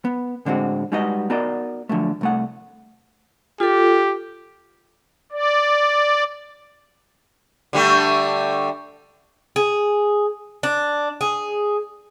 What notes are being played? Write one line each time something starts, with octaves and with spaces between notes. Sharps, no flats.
B3
A2 D3 G#3 C4 F#4
G3 G#3 D#4 F#4 B4 D#5
B3 D#4 F#4 A#4 D5 D#5
D3 F3 F#3 A3
C2 A3 F#5
F4 G4 A4
D5
D3 G3 A3
G#4
D4
G#4